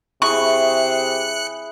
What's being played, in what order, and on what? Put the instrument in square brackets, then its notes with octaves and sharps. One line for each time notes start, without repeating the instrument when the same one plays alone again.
[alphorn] C3 [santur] E4 G#4 [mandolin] C#6 [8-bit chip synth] F#6 C#7